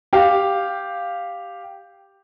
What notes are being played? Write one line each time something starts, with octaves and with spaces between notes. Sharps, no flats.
G4 F5